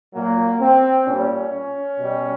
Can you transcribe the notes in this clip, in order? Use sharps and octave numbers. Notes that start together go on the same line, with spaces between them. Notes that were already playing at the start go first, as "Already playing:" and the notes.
A#2 F#3 A#3
C4
A#2 G3 C#4
B2 G3